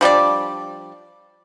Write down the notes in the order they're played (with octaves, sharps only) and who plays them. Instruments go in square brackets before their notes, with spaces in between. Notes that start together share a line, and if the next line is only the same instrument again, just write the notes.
[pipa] F3 G3 D4 D5